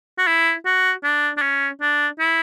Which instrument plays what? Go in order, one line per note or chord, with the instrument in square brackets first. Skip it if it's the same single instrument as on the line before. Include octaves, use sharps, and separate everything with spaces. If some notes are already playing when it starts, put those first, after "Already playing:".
[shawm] F#4
E4
F#4
D4
D4
C#4
D4
E4